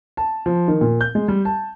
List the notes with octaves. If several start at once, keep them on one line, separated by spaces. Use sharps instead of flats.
A5
F3
D#3
A#2
G6
G#3
G3
A5